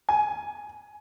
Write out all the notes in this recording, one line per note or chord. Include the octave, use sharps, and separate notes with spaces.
G#5